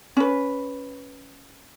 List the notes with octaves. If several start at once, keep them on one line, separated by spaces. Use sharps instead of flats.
C#4 B4